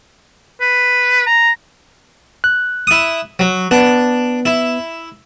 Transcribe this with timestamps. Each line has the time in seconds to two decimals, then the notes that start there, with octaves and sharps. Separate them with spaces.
0.61 B4
1.27 A#5
2.44 F#6
2.87 E4 D#6
3.39 F#3
3.71 B3 D4
4.45 E4